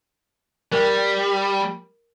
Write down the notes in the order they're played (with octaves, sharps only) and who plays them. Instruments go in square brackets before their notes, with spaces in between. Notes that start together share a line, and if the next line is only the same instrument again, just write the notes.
[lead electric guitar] G3 [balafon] A#4